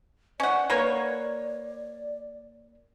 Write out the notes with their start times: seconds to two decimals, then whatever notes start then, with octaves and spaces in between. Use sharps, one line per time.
0.40 C#4 D5 F#5
0.70 A#3 B4 C#5